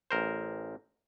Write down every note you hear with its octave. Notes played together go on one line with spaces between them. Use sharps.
A1 A#4 C5